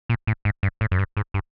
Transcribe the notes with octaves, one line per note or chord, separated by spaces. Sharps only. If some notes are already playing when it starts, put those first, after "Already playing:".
A#2
A2
G#2
G2
A2
F#2
G2
G#2
G2